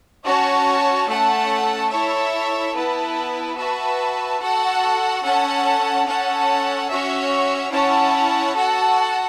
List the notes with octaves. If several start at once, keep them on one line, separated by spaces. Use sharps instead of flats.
C#4 F#4 C#5 A5
A3 C#4 A4 F#5 A5
E4 A4 C#5 E5
B3 E4 B4 A5
F#4 B4 E5 A5
F#4 A4 F#5 A5
C#4 A4 F#5 A5
C#4 A4 F#5 A5
C#4 F#4 C#5 E5
C#4 E4 C#5 F#5 A5
F#4 A4 F#5 A5